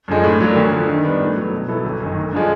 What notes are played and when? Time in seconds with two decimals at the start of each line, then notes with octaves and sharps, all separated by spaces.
0.08 F#2 D3 F3 G#3
0.24 A2
0.40 F#3 A#3 D4
0.56 D2
0.72 D3 F3
0.88 D#3
1.04 G3 B3 D4
1.19 A2
1.36 F#3 B3
1.53 B2
1.68 F#3 B3 E4 A4
1.84 G1
2.01 F#2 D#3
2.17 D2
2.32 D3 F3 G#3